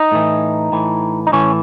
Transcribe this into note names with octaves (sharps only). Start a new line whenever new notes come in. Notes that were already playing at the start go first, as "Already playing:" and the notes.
Already playing: D#4
A2 E3
A2 E3
D#4
A2 E3 C#4